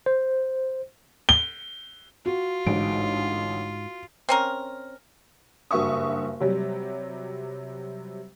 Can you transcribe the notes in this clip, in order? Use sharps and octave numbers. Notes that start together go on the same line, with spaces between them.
C5
G7
F4 F#4
A1 G#2 D3 D7
C4 C#4 A#4
F#1 G2 F#4 E5 C#6 D#6
C3 F#3 G3